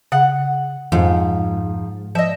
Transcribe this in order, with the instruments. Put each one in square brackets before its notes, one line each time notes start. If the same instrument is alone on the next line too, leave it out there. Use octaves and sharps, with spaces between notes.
[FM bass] C#3 [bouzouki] F#5
[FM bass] F2 [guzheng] G#2 [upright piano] F3 D#4 F4
[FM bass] F3 [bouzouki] D#5 E5